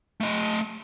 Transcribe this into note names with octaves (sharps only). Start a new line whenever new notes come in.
A3 D#5